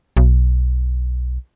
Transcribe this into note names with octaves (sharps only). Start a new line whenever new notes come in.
B1